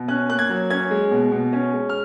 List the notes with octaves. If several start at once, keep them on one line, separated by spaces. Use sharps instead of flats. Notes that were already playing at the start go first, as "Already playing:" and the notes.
Already playing: B2
C#4 F#6
A#3 F#6
G#6
F#3
C#4 G#6
G#3
B2
B2
C#4
G#3
F6